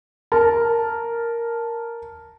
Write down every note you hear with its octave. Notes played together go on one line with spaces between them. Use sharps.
A#4 A5